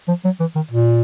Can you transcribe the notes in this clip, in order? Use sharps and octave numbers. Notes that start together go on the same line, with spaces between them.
F3
F#3
E3
D#3
A#2